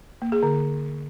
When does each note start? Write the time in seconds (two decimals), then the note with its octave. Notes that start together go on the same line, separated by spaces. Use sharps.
0.22 A#3
0.32 G#4
0.43 D3